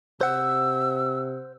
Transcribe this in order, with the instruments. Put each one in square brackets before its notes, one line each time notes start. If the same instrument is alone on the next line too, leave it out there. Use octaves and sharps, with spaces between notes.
[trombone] C3 [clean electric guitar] C5 F#5 [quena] E6